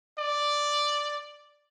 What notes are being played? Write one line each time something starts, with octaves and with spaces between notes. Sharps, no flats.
D5